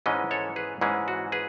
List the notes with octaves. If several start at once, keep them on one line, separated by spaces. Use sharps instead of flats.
G#2 E3 G#3 C#4 B4 D#5
A4 C#5
G#4 B4
G#2 E3 G#3 C#4 G#4
F#4
G#4 B4